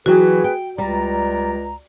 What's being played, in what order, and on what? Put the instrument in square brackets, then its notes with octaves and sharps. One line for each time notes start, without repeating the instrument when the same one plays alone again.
[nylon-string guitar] E3 F#3 G5 [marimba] F#4 [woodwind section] G#4 B4
[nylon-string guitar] G5
[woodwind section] C#2 D5 A#5 [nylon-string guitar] G3